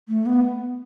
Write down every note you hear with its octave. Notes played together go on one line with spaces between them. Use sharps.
A3
B3